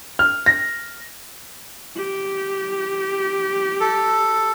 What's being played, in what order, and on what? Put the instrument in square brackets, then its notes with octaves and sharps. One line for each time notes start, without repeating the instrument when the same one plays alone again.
[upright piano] F6
A#6
[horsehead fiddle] G4
[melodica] A4